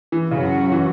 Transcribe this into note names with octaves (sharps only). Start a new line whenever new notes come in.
E3
F#2 C#3 F#3 C#4 F#4
E3